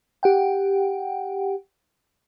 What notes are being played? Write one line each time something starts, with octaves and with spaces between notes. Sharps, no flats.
G4 F#5 G5